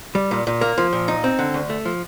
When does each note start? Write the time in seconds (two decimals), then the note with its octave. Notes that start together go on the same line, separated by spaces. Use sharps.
0.15 G3
0.31 A#2
0.47 A#2
0.61 A#3
0.78 F3
0.93 A#2
1.08 D#4
1.24 C4
1.39 D3
1.54 D2
1.70 A3
1.85 F3